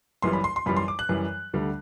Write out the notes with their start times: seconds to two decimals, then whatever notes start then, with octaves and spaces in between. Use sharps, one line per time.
0.22 F#1 F#2 E3 G3 C6
0.33 B5
0.44 C6
0.56 C6
0.66 F#2 E3 G3 B5
0.77 C6
0.88 D6
0.99 F#6
1.09 F#2 E3 G3
1.54 D2 D3 G3